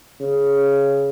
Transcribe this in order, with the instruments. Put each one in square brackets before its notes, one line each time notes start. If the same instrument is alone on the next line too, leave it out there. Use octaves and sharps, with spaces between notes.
[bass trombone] C#3